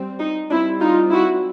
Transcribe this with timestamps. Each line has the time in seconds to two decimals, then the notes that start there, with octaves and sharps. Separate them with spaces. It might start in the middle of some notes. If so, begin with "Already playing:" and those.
Already playing: G3 C4
0.20 D#4
0.51 G3 D4 E4
0.56 C4
0.81 D#4 F4
1.12 E4 F#4